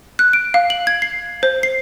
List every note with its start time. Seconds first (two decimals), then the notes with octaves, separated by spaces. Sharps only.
0.19 F#6
0.33 D7
0.54 F5
0.70 F#7
0.87 G#6
1.02 C7
1.43 C5
1.63 C7